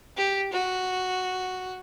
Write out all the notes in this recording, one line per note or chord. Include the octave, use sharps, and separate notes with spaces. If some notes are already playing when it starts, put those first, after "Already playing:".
G4
F#4